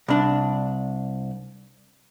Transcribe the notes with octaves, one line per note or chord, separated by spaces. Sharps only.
C2 D4